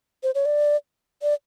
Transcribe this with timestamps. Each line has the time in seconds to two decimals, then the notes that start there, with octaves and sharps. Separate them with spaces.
0.23 C5
0.35 C#5
0.46 D5
1.22 D5